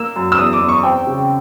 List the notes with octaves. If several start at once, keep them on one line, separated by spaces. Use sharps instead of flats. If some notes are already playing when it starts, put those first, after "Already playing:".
Already playing: A#3 E6
F#2
E6
E2 D#6
D6
E2
C#6
C4 G5
C#3